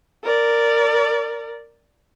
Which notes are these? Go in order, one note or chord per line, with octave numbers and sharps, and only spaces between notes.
A#4 D5